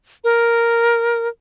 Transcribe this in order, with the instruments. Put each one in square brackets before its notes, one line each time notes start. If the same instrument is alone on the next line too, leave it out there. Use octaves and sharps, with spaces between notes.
[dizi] A#4